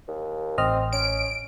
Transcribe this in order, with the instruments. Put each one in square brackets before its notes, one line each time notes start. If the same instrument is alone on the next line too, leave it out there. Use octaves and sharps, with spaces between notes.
[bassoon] D#2
[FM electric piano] A1 D#5 F6 [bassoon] C4
[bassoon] C#4 [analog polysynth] D7